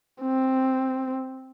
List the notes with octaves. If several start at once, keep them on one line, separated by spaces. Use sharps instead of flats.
C4